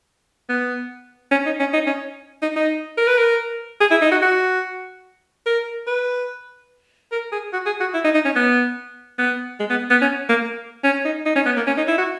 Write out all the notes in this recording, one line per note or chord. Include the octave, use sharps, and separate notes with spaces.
B3
C#4
D#4
C#4
D#4
C#4
D#4
D#4
A#4
B4
A#4
G#4
E4
D#4
F#4
F#4
A#4
B4
A#4
G#4
F#4
G#4
F#4
E4
D#4
D#4
C#4
B3
B3
G#3
B3
B3
C#4
A#3
C#4
D#4
D#4
C#4
B3
A#3
C#4
D#4
E4
F#4